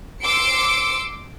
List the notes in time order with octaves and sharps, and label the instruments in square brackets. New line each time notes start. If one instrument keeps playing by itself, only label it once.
[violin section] C6 D6 E6 C#7 D7